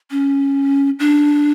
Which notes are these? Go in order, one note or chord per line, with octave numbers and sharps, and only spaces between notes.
C#4
D4